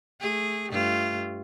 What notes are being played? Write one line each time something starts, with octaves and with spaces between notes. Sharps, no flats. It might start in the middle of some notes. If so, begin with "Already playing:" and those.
A3 G#4
G2 A3 F4